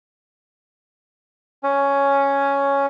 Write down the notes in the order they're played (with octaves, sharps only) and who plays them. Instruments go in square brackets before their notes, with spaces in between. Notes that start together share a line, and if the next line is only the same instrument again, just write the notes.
[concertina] C#4